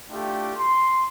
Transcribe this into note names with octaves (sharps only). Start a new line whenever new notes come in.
A3 D4 E4 F4 G4 G5
C6